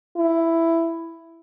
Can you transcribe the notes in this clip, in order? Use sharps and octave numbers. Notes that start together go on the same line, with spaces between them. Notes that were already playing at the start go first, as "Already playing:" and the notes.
E4